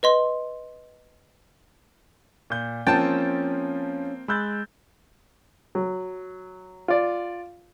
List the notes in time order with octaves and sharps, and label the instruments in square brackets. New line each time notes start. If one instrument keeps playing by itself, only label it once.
[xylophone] B4 D#5 C6
[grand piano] A#2 G6
[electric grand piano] F3 A6 [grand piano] A#3 C4 [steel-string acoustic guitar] C#4 [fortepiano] G5 A5
[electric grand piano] G#3 E6 G6 [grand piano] B5 F#6 A6
[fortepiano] F#3
F4 D5